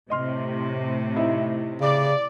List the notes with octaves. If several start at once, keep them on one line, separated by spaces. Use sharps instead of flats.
A2 C3 D#5 C6 F6
D#4 E4 E5
C#3 D5